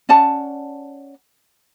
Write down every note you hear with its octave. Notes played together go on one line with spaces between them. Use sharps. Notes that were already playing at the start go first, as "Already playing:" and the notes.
C#4 D5 F#5 A5